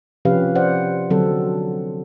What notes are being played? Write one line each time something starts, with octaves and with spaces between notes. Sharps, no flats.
C3 F3 C#4 G4 B4 F5
C5 D5 F#5
D3 F#3 C4 A4